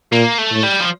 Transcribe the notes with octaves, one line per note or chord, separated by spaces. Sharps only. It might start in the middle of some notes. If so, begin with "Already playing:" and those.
A#2 A#3
A3
A2
G3
F3